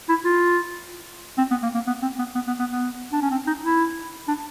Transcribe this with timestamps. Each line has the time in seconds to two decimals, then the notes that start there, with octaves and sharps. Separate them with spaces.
0.09 E4
0.25 F4
1.38 C4
1.51 B3
1.63 A#3
1.74 A#3
1.87 B3
2.02 C4
2.18 B3
2.35 B3
2.47 B3
2.59 B3
2.71 B3
3.12 D4
3.21 C#4
3.31 C4
3.47 D#4
3.64 E4
4.28 D4